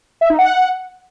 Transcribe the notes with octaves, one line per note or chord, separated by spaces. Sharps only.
E5
D#4
F#5